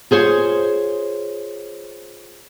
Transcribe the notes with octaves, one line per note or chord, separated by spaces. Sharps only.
F4 G#4 C5 C#5